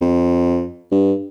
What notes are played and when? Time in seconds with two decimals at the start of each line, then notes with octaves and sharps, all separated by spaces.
0.02 F2
0.92 G2